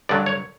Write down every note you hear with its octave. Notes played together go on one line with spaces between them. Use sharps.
G2 D3 F#3 D5
C#5